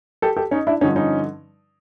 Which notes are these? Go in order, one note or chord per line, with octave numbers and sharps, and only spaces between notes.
G4 A4
G4 A4
C#4 D#4
D4 E4
G2 D3 F3 C#4 D#4
C#4 D#4